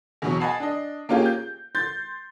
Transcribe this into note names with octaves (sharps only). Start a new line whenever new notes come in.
E2 B2 F#3
D#5 F#5 G#5 A5 B5 C7
D4 D#5
A#3 C#4 F4 G4 G#4
G6
C6 G6 A6